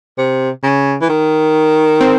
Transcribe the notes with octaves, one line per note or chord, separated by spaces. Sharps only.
C3
C#3
E3
D#3
C4